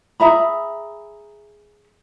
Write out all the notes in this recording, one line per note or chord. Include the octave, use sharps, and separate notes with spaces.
G#4 E5 A#5 B5